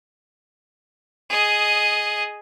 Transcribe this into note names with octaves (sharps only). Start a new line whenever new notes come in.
G#4 D#5